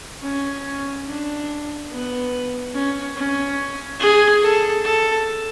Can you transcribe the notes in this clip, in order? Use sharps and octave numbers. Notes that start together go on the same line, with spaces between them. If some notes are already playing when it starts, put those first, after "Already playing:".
C#4
D4
B3
C#4
C#4
G#4
A4
A4